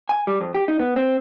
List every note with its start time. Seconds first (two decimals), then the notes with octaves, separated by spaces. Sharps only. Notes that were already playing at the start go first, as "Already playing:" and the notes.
0.09 G#5
0.27 G3
0.41 F2
0.54 G4
0.68 D#4
0.79 B3
0.96 C4